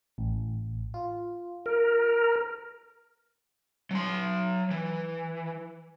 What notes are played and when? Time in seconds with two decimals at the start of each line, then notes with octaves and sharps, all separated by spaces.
0.18 A1
0.94 F4
1.66 A#4
3.91 F#3 C6
4.71 E3